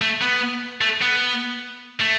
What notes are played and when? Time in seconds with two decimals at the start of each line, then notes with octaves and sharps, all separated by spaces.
0.02 A3
0.22 B3
0.81 A3
1.01 B3
2.00 A3